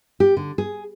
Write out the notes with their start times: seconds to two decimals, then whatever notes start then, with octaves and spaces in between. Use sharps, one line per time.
0.20 G4
0.37 D3
0.58 G#4